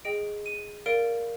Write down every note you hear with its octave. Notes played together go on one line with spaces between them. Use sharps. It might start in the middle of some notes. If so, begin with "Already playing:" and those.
G#4 D#5 G5 D7
D#7
A#4 D5 F5 D7